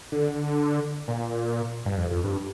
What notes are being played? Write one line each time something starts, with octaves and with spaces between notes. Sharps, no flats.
D3
A#2
G2
F2
F2
G2